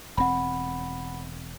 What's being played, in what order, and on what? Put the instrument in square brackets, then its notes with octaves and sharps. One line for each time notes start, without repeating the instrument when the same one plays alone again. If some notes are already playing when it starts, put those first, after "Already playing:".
[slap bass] E1 C4 [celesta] F#5 B5